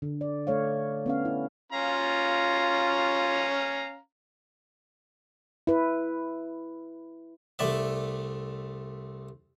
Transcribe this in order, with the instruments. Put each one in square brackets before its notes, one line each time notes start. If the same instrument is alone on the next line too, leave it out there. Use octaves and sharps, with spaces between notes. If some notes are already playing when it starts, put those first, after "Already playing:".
[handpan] D3
D5
A3 C#5 F5
B3 C#4 F5
E4
[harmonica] C#4 F5 A#5 [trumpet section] F4
[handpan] E4 B4
[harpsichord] C2 A3 D5 E5